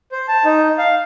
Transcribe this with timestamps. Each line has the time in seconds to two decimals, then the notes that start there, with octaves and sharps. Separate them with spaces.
0.12 C5
0.28 A5
0.45 D#4
0.78 F5